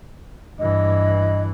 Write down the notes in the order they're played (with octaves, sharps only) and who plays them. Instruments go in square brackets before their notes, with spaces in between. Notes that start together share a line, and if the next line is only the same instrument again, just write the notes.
[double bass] G2 E3 [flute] D#5